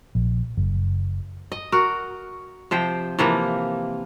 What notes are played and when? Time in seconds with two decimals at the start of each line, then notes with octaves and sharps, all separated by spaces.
0.15 A#1
0.57 F#1
1.52 D#5
1.72 F#4 A#4
2.71 C3 F3 C5 G5
3.19 C3 E3 F3 A#3